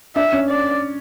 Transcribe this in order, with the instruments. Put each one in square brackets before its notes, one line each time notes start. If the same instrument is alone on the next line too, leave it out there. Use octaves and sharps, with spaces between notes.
[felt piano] D4 [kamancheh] E5
[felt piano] C#4
[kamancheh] D5